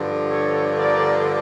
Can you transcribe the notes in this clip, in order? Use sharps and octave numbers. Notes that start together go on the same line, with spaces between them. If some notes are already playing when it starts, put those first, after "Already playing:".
Already playing: G2 D3 F3
A4 C#5
A#4 D5